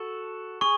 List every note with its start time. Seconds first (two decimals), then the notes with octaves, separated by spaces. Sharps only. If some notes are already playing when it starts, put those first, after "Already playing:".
Already playing: F#4 A4
0.61 G#4 C#6